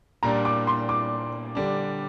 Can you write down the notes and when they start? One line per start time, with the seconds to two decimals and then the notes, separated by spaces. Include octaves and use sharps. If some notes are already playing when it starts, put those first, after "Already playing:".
0.23 A#2 G3 A#3 D4 A#5
0.45 D6
0.67 C6
0.89 D6
1.55 D3 G3 D4